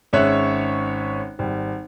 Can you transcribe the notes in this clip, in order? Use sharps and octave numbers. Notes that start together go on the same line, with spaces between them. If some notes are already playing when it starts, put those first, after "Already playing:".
G#1 G#3 C#4 C#5 E5 F#6
G#1 G3